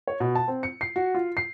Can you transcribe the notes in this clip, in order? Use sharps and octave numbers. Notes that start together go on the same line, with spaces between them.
C#5
B2
A5
C4
C#7
C7
F#4
F4
C7